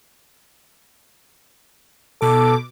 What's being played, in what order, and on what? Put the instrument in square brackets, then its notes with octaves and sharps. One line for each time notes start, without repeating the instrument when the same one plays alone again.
[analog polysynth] B2 D6 [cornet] A4